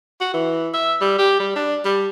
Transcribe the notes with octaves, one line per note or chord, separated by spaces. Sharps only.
F#4
E3
E5
G3
G4
G3
D4
G3